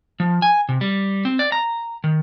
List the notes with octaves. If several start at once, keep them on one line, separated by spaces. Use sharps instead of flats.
F3
G#5
C3
G3
C4
D5
A#5
D#3